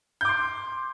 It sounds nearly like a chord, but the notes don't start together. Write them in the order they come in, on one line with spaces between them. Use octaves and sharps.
G6 D6 C6